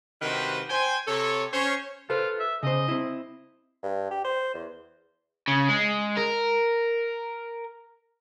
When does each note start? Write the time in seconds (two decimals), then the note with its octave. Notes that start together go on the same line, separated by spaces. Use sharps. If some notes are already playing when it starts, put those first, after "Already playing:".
0.22 G2 C3 D#3 F#4 B4 C5
0.69 C5 G5 G#5
1.07 C3 A4 C#5
1.52 C#4 C5 C#5
2.10 F4 A4 B4 C5
2.40 E5
2.63 C#3 C5 D#5
2.88 C4 E4
3.83 G2
4.10 G4
4.24 C5
4.54 E2
5.48 C#3
5.70 G#3
6.17 A#4